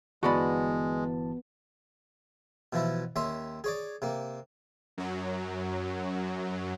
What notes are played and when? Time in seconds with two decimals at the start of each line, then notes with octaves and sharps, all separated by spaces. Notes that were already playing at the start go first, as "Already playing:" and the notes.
0.23 G1 E3 G#3 B3 F#4 D5 A5 B5
2.73 B2 E3 F3 E4
3.16 D#2 C#4 E5 C6
3.64 G#4 C#5 D5
4.02 C3 A#3
4.98 F#2 F#3